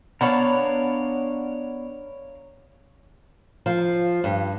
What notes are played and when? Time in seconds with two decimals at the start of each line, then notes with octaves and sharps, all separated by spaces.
0.21 B3 D4 A#4 C#5 F5 F#5
3.66 F3
4.24 G2